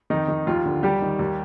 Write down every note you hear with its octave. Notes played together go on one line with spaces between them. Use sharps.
F2 D#3 D#4
D#3
D#2 F3 F4
D3
D#2 G3 G4
D#3
D#2